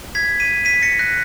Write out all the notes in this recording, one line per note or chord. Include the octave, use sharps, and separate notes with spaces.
G#6 B6
B6 D#7
B6 D#7
A#6 C#7
F#6 A#6